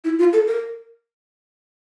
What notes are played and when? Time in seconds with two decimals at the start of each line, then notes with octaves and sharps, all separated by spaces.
0.04 E4
0.19 F4
0.33 A4
0.47 A#4